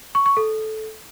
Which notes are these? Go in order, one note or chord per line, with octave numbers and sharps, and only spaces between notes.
C#6
C#6
A4